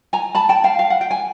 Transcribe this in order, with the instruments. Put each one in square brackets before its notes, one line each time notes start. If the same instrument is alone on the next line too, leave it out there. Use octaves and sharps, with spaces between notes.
[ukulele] G#5 A#5
A5 B5
G5 A5
F5 G5
F5
F#5
G5
G#5